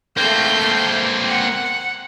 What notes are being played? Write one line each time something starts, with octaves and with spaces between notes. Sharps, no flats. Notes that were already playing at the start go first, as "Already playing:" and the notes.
A3 A#3 C4 G6
F#5